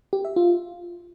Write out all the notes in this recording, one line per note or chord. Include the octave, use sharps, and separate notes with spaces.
G4
E5
F4